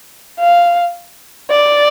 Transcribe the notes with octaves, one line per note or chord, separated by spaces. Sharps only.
F5
D5